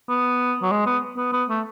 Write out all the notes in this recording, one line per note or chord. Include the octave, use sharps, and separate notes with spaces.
B3
F#3
G#3
B3
B3
B3
A3